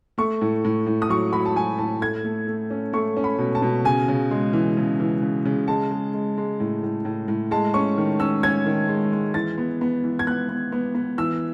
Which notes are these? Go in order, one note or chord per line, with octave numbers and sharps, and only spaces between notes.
A3 C#6
A2
A2
A2
D#6
F#3 C#6
F#3 B5
A5
F#3 G#5
A2 A5
A3 G#6
A3
A3
C#4
A3 C#6
C#4
B5
B2
A5
B2
C#3 G#5
C#3
G#3
E3
C#3
E3
C#3
C#3
G#3 A5
G#3
G#3
G#3
A2
A2
A2
A2
G#3 A5
C#4 C#6
D#3
C#4 E6
C#4 G#6
D#3
G#3
G#3
E3 A6
B3
B3
E3
G#6
B3 F#6
B3
B3
B3
E3 E6